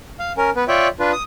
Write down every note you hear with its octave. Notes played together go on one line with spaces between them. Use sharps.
F5
C#4 A#4
B3 B4
F4 C#5 D5 E5 G5
D4 F4 B4
D#6